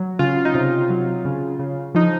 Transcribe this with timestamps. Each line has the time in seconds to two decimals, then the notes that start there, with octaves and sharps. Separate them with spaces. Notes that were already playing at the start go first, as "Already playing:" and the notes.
Already playing: F#3
0.19 C#3 F4
0.45 D#4
0.54 C3 F4
0.90 F#3
1.25 C#3
1.59 C#3
1.95 F3 D#4